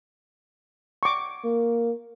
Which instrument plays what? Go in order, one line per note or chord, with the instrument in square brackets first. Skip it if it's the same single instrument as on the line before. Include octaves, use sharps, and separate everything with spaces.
[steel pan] C#6 D6
[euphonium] A#3